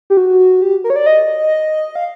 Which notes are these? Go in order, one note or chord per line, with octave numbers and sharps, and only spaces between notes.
G4
F#4
G4
A#4
C#5
D5
D#5
F5